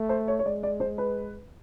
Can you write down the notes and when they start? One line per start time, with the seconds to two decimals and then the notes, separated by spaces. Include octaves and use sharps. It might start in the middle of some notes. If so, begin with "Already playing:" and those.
Already playing: A3
0.09 C5
0.28 C#5
0.39 C#5
0.45 G#3 D5
0.63 D5
0.80 C5
0.98 B4